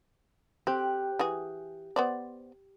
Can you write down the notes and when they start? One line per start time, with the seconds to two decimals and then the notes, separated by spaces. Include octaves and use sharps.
0.67 C4 G4 F#6
1.19 E3 F#4 G#4
1.96 B3 C5 D5